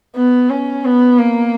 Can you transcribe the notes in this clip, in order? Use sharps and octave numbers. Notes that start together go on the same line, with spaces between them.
B3
C#4
B3
A#3